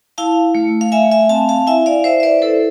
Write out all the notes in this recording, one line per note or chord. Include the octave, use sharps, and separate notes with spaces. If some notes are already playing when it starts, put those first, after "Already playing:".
E4 F5 A5
A3
F5
A3 E5 G#5
E5 G#5
C4 F5 A5
F5 A5
E4 E5 G#5
D5 F5
E4 C5 E5
E5
B4 D5
E4 A4 C5